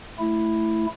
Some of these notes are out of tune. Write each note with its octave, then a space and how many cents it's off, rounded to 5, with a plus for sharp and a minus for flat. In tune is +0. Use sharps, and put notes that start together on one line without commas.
A3 +0 E4 +0